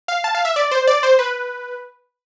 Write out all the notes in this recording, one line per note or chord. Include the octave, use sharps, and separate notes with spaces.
F5
A5
F5
E5
D5
C5
D5
C5
B4